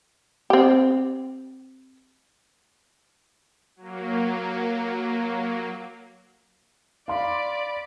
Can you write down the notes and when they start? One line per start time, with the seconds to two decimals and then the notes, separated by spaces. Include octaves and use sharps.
0.50 C4 G4
3.76 F#3 A#3
7.08 D5 F5 B5 C6